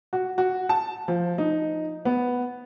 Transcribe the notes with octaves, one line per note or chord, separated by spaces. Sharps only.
F#4
F#4
A5
F3
D#4
B3